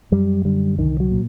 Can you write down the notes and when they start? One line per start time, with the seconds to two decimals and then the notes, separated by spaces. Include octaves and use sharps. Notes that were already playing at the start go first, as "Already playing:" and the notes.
0.12 F#2 G3
0.45 D3 G3
0.78 C2 D#3
1.00 F#3
1.11 A#2